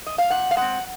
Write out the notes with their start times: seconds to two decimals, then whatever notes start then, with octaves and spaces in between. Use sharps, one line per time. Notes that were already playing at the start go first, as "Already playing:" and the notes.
0.07 D#5
0.18 F5
0.30 A#2 F#5
0.51 F5
0.57 G#3 C4 F#5